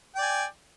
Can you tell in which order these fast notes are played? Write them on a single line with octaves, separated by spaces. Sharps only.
G5 D5 G#5